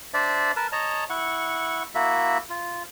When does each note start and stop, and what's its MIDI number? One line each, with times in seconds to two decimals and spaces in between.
0.14 0.52 62
0.14 0.52 72
0.14 0.52 74
0.14 0.52 76
0.56 0.67 70
0.56 0.67 71
0.56 0.67 81
0.72 1.04 73
0.72 1.04 75
0.72 1.04 81
0.72 1.04 82
1.10 1.83 64
1.10 1.83 78
1.10 1.83 85
1.95 2.38 58
1.95 2.38 64
1.95 2.38 66
1.95 2.38 76
2.50 2.83 65